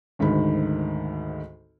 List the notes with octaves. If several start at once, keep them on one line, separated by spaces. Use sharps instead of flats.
G#1 D2 G#2 D#3 B5